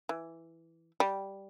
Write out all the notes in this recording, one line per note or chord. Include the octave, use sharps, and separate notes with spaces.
E3
G3